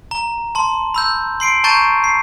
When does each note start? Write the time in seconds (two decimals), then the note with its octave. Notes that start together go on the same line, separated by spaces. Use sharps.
0.11 A#5
0.55 A5 C6
0.94 B5 E6 G6
1.40 C6 C7 D7
1.64 A5 A#5 C#6 G6 A6 D#7
2.04 C7